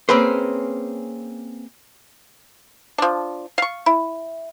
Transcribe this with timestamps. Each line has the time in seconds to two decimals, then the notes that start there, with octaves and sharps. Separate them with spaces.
0.09 A#3 C4 C#4 G#4 B4 C5
2.98 F3 D4
3.58 F5 C#6
3.86 E4